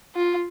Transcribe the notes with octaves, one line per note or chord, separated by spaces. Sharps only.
F4